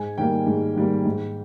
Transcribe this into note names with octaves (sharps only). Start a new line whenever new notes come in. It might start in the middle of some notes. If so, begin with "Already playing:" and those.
Already playing: G#2 G#5
D#3 G3 A#3 G5
G#2
D#3 G3 A#3
G#2